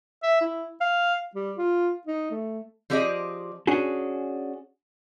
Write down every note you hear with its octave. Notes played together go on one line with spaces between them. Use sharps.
E5
E4
F5
G3
F4
D#4
A3
F3 C4 G4 G#4 D5 D#5
C#4 D4 F#4 G#4